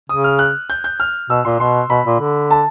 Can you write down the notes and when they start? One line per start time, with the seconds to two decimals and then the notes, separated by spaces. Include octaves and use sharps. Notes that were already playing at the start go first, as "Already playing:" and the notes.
0.09 C#3 D#6
0.24 F6
0.39 F#6
0.70 G6
0.84 G6
1.00 F6
1.30 B2 E6
1.45 A#2 C6
1.60 B2 C6
1.90 B2 B5
2.06 A#2
2.20 D3
2.51 A5